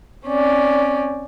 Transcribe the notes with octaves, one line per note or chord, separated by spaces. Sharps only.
C4 C#4 D5